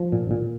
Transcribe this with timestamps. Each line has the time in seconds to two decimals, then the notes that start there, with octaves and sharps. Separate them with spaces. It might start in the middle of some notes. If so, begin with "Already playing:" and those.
Already playing: F3
0.12 A#2
0.31 A#2